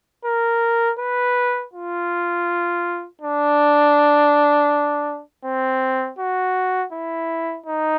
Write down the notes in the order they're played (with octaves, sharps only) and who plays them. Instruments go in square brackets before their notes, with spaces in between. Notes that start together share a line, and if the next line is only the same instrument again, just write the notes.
[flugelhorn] A#4
B4
F4
D4
C4
F#4
E4
D#4